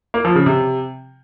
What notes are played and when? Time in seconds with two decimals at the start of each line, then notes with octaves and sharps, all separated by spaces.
0.14 A#3
0.25 F3
0.35 C#3
0.46 C3